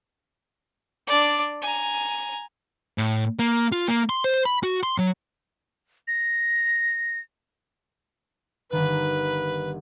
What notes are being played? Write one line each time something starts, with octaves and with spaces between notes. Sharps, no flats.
D4 D5
G#5 A#5
A2
A#3
F4
A#3
C6
C5
B5
F#4
C6
F#3
A#6
G1 D#3 B4 F#6